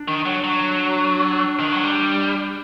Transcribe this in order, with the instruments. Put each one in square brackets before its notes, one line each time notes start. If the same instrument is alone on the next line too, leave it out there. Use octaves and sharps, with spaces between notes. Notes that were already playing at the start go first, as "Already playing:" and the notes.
Already playing: [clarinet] D4
[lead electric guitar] D#3
F#3
F#3
D#3
F#3
G3